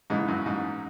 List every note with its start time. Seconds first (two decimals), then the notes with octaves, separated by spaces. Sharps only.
0.10 G#2 C#3 E3 G#3
0.28 F#2
0.46 G#2